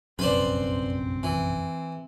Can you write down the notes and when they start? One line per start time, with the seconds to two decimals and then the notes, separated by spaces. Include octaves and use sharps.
0.19 F1 A#1 F#2 C4 B4 C5 D5
1.23 E3